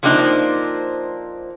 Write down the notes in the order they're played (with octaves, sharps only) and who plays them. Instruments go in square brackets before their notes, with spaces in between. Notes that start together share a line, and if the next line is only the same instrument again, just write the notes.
[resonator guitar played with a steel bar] F3 A#3 C4 D4 D#4